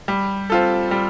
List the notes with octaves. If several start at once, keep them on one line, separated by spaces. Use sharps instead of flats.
G3
C4 F4 A4
G3